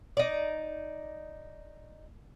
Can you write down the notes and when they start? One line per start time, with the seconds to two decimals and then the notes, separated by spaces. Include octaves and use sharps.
0.17 D#4 D5